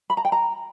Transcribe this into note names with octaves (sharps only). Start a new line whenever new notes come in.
B5
A#5
G5
A#5